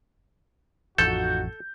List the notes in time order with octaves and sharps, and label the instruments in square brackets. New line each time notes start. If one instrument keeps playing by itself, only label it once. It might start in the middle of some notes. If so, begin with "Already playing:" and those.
[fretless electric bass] A1 F2 [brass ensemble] D#4 F4 F#4 [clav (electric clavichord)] A4 [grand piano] G6